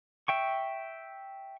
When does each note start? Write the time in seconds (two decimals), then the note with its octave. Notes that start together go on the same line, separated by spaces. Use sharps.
0.28 E5 G5 C#6